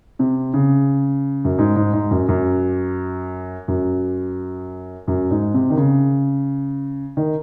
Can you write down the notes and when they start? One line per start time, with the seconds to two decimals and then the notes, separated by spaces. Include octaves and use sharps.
0.19 C3
0.54 C#3
1.45 F#2
1.58 G#2
1.76 G#2
1.93 G#2
2.11 F#2
2.28 F#2
3.68 F#2
5.08 F#2
5.30 G#2
5.54 C3
5.70 D#3
5.77 C#3
7.17 D#3